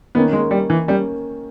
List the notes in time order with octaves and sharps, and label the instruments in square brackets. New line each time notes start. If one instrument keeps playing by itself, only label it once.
[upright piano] D#3 A#3 C#4 [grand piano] B3
[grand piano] G#3
G3
E3
[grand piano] G3 [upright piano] A#3 C#4